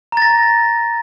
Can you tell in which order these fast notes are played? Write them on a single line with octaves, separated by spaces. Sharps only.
A#5 A6 A#6